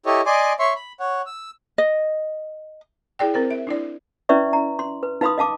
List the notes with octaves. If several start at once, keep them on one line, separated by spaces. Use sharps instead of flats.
E4 G4 A4 C#5 D#5
D5 D#5 G#5 C6 D6
C#5 E5 C6 C#6
B5
C#5 F#5
E6
D#5
E4 G#4 D5 G5
C4 A#4 C5
E5
D4 E4 D5
C#4 E4 B4 D5 E5 C#6
A#5
C6
B4
D#4 B4 F5 B5 C6 D#6
D#5 F5 A5 D6